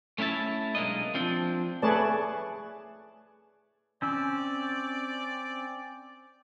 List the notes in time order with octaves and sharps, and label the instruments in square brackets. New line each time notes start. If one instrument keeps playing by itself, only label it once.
[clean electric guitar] A3 C#4 E4 E5 A5
B1 G#3 A#3 D4 D#5
F3 C4 D4
[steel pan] A3 G#4 B4 C#5 D5 A5
[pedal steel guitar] C4 C#4 E6 [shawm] D5